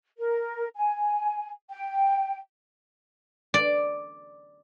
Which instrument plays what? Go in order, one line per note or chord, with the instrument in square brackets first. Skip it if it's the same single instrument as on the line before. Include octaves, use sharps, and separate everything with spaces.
[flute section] A#4
G#5
G5
[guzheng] D5